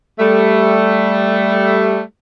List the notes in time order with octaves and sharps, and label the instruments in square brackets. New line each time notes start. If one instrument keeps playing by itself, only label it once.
[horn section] G3 A3